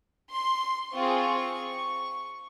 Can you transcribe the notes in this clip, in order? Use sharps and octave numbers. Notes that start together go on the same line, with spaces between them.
C6
C4 F4 G#4 C#6